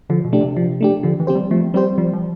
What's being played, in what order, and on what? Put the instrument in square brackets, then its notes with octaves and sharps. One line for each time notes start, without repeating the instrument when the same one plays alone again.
[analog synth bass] D3 [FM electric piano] F3
[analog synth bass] B2
[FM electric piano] A3 D4 G4
[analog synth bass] C3
[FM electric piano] F3
A3 D4 G4
[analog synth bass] D3 [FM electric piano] F3
[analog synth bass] E3
[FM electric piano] C4 G4 C5
[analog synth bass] G3
[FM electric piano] F3 [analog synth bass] A3
[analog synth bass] G3 [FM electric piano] C4 G4 C5
[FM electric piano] F3 [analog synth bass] G3
[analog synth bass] F3